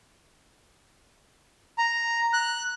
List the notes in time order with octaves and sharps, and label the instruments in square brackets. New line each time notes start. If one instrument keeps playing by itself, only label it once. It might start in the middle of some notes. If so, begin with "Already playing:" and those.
[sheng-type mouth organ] A#5
F#6